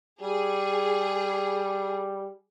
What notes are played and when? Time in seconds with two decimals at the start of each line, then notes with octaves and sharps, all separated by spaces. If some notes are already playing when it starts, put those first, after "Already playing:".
0.22 G3 G#4